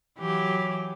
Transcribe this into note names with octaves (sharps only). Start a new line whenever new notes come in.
E3 F#3 G4